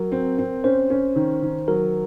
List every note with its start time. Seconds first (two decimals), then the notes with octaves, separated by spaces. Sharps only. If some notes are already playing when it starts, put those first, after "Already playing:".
Already playing: F#3 A#4
0.12 C4
0.38 C4
0.64 C#4 C5
0.90 C#4
1.16 D#3
1.42 D#3
1.68 F#3 A#4